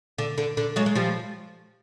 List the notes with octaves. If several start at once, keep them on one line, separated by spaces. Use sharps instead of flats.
D3
D3
D3
F#3 G#3
G#3
F3 G3